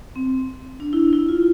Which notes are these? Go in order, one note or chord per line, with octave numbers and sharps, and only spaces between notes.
C4
D4
E4
D4
E4
F4